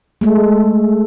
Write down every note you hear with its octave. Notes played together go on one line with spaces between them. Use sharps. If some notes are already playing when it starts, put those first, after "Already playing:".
G#3 A3